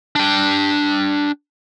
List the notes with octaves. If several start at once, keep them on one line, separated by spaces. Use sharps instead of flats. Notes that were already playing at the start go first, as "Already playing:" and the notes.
D4 G5